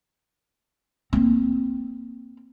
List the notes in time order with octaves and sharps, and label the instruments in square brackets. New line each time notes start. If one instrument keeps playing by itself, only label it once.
[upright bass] A#3 C4